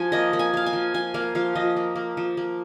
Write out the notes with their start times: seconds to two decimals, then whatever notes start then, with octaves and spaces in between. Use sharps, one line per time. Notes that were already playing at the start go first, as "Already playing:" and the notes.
Already playing: F3 G#5
0.12 A#3 D#5
0.33 A#3
0.39 G#5
0.53 A#3 F5
0.66 G#5
0.73 F3
0.94 F3 G#5
1.14 A#3 F5
1.35 F3 F5
1.55 F3 D#5
1.76 A#3
1.96 A#3
2.17 F3
2.37 A#3